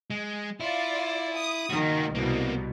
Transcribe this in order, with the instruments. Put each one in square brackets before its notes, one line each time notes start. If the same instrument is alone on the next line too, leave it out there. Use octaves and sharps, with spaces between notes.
[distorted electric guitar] G#3
[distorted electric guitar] E4 [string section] F4 D5
[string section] D#6
[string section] D#3 [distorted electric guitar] A#3 F#4
[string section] C2 B2 [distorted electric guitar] A#3 B3